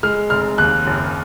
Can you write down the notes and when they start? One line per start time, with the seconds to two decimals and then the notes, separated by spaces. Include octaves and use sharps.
0.03 G#3 F6
0.30 F1 F6
0.58 D#2 F#6
0.87 F#1